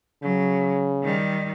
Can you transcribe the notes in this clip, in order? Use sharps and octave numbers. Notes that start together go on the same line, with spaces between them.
C#3 F#3
D#3 G3